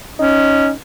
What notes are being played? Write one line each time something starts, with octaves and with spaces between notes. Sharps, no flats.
C#4 D#4